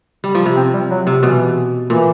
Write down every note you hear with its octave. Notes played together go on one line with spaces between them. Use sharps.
G3
F3
C3
C4
G3
F#3
C3
B2 E3
A#2 E3